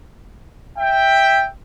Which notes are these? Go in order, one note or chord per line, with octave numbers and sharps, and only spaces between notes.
E5 G5